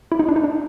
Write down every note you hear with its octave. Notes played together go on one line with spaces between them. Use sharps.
E4
D#4
D4
D#4
D4